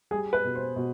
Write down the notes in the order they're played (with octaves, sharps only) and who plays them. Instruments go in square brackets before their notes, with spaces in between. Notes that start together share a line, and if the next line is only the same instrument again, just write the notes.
[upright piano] G3 G#4
B4
B2
C5
B2